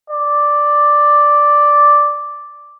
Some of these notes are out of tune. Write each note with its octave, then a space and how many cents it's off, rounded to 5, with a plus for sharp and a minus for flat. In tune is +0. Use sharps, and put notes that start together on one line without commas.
D5 +0